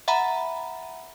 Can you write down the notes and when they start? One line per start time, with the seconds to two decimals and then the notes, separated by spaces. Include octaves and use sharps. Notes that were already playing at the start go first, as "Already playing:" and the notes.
0.08 E5 F#5 A#5 B5